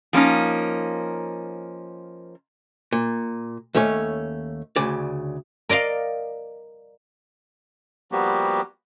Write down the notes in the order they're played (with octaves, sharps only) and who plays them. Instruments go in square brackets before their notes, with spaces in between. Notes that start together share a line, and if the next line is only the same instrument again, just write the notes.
[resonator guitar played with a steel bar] F3 A#3 C#4 D#4
[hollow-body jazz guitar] A#2
D#2 A3 C#4 C#5
D2 C#3 D5
[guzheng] A#4 D5 D#5 F5
[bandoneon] F3 G3 A#3 B3 F#4 G4